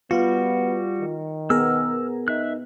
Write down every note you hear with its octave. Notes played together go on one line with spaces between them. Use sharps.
G3 B3 F4 F#4
D#3
B3 G#4 A#4 E6 F6
D#4 E5 F#6